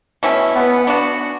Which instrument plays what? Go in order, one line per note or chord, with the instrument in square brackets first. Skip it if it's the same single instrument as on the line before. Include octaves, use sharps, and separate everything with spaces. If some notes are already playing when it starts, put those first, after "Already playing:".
[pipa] B2 A3 C#4 E4
[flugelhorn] B3
[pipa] B3 D4 F#4